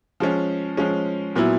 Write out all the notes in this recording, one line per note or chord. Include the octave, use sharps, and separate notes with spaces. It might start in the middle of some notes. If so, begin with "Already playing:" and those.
F3 G#3 C#4
F3 G#3 C#4
A#2 F#3 B3 E4